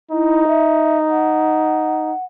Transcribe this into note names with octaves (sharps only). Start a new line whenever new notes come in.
D#4 E4
E5
F#5